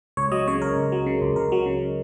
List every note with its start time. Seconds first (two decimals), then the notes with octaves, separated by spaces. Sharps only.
0.17 C#2 C#5
0.32 F#3 D#5
0.48 C#3 C#5
0.62 C#2 A#4
0.77 C#2
0.92 F#3
1.06 C#3
1.21 C#2
1.36 C#2 A#4
1.52 F#3
1.66 C#3